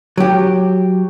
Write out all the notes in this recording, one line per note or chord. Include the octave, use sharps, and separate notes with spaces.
F#3 G4